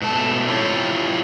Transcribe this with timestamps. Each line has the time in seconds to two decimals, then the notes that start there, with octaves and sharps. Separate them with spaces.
0.02 G#2 B2 A3 A5
0.48 C4 E4 F4 G4 C#5